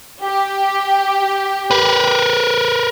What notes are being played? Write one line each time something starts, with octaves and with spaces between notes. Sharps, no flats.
G4
A#4 B4